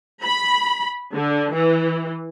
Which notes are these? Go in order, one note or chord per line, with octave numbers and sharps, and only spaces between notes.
B5
D3
E3